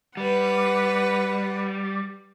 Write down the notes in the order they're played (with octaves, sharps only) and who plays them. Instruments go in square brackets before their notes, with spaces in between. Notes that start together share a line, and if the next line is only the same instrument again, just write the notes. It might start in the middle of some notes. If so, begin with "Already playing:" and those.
[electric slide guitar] G3 [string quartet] B4 F#5